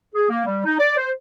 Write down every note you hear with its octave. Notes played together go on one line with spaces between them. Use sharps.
G#4
A#3
G3
D#4
D5
C5